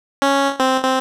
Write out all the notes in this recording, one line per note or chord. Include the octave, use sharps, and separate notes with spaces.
C#4
C4
C4